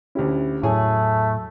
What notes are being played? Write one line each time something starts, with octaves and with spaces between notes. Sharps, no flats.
D2 C#4 E4 G4
E2 A2 F#3 A3 G#4 C#5 G#5